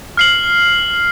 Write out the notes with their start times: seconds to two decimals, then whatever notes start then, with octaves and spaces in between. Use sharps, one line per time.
0.17 F6 C7 F#7